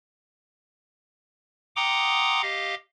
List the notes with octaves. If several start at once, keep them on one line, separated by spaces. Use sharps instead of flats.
F#5 G5 A#5 C6 D6 D#6
G4 D#5 F5